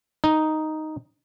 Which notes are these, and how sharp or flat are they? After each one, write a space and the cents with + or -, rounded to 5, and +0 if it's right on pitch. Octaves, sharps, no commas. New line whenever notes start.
D#4 +0